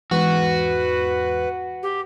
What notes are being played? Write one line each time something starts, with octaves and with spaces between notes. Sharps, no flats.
E2 G#2 F#4 B4
G4